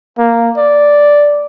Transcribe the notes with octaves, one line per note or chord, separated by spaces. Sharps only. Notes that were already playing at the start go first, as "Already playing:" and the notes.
A#3
D5